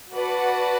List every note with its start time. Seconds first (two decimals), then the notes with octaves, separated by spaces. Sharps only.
0.13 F#4 B4 D5 F#5 A5